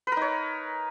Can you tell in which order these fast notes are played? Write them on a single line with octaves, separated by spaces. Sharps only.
B4 A#4 D#4 C#5